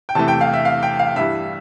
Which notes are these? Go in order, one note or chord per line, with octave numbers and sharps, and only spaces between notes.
G5
E2 C3 E3 A3 A5
G5
F5
E5
F5
G5
F5
G2 E3 G3 E5